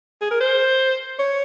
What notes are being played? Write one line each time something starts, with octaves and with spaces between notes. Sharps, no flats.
G#4
A#4
C5
C#5